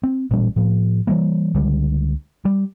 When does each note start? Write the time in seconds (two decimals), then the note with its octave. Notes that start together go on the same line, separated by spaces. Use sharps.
0.03 C4
0.31 A1 A#2 G3 C#4
0.56 A2 F3
1.07 E3 G3 A#3
1.55 C#2 D3 G3 G#3
2.45 G3